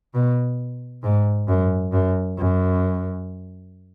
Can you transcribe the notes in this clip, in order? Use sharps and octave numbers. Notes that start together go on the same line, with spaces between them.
B2
G#2
F#2
F#2
F#2